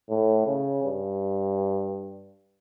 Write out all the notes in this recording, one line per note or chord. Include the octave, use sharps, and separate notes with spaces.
A2
C#3
G2